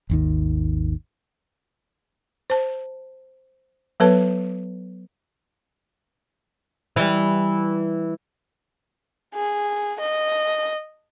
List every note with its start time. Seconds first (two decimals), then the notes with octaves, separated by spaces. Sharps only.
0.10 G#1 D#2 D#3
2.50 C5 A5
4.00 F#3 B3 A4 B4 C#5 A5
6.96 E3 G3
9.35 G#4
10.00 D#5